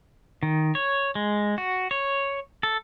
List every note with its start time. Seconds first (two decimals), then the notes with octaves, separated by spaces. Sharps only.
0.43 D#3
0.75 C#5
1.15 G#3
1.58 F#4
1.91 C#5
2.63 A4